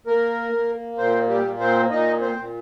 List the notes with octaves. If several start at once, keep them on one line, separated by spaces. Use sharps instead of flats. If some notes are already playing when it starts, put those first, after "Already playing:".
A#3 A#4
A#3
A#2 C4 C5
G3 G4
A#3
C4 C5
A#2 D#4 D#5
C4 C5
A#2